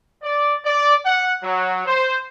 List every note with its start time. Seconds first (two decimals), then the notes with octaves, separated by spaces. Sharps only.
0.22 D5
0.65 D5
1.05 F#5
1.43 F#3
1.86 C5